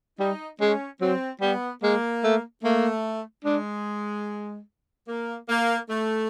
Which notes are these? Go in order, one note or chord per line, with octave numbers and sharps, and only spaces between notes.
G3 D#4
G#3 C#4
F#3 C4
G3 B3
G#3 A#3
A3
A3 A#3
G#3 D4
A#3
A#3
A3